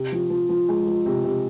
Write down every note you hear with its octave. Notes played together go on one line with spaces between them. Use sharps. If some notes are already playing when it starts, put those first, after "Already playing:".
Already playing: C3
F3
F3
F3
G#3
F3
C3
C3